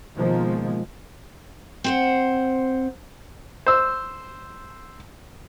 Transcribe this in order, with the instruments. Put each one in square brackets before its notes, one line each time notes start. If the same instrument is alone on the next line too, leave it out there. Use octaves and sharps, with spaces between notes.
[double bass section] B2 D#3 F3 G#3 A#3
[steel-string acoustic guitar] C4 C5 F#5
[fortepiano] C5 E6